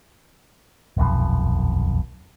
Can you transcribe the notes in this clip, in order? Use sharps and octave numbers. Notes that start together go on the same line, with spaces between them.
D#1 B1 F2